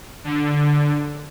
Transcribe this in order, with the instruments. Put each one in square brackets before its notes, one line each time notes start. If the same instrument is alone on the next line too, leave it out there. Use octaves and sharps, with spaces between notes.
[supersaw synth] D3